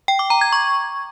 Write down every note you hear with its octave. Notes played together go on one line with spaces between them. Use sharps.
G5
D6
A#5
G#6
C#6